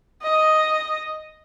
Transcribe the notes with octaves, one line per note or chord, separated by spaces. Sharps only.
D#5